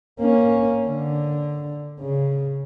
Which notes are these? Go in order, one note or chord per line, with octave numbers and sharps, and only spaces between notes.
A#3 C#4
D3
C#3